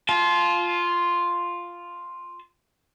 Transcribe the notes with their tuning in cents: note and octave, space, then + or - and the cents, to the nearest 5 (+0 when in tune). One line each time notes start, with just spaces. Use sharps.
F4 +0 A5 -35